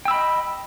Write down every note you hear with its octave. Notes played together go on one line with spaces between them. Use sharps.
D#5 G5 B5 E6